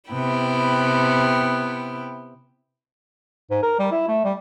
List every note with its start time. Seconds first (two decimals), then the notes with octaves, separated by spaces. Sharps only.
0.11 C3 B3 E4 G5
3.51 G#2
3.63 A#4
3.79 G3
3.92 E4
4.08 A3
4.24 G3